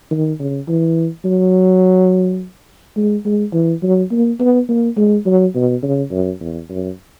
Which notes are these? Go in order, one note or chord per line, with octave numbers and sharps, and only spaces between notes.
D#3
C#3
E3
F#3
G#3
G#3
E3
F#3
A#3
B3
A#3
G#3
F#3
B2
C#3
F#2
E2
F#2